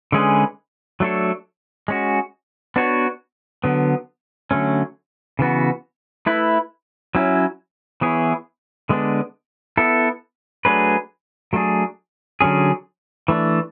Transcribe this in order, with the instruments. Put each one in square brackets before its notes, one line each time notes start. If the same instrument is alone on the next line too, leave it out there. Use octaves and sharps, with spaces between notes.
[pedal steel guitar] D3 G#3 C#4 G#4 B4
F#3 A3 D4 A4 C#5
G#3 C#4 F#4
B3 D4 F#4 C#5
D3 F#3 B3
D3 F#3 A3 C#4
C#3 E3 B3 F#4
A3 E4 B4
F#3 C#4 E4
E3 B3 E4 G#4 C#5
D3 G#3 B3 D4
B3 E4 A4
F#3 A3 D4 G#4 B4
F#3 A3 D4 G#4
D3 F#3 C#4 G#4
E3 A3 D4